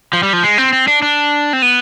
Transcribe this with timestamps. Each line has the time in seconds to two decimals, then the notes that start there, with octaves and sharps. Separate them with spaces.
0.13 F3
0.23 G3
0.33 F3
0.43 G#3
0.58 C4
0.73 C4
0.88 D4
1.02 D4
1.53 C4
1.62 B3